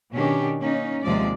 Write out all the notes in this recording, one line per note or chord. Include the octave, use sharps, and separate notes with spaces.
B2 D#3 C#4 D4 G4
A#3 C#4 D#4
D#2 C3 F3 G#3 D5